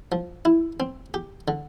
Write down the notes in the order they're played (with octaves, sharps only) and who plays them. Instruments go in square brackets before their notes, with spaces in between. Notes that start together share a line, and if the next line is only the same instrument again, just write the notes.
[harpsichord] F3
E4
C4
G4
D3